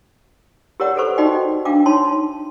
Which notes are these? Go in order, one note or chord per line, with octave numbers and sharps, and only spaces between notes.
G4 A#4 C#5 D5 F#5
A4 B4 C5 C#6
D#4 F#4 G4 D5 D#5 G5
D4 F5 G5 D6
D#4 C#5 A5 C6